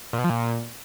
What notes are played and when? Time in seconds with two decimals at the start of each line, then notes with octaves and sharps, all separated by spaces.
0.13 A#2
0.19 B2
0.24 F3
0.30 A#2